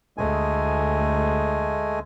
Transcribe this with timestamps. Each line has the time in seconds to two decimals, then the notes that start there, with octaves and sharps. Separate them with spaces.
0.18 D2 G#3 A3 G#5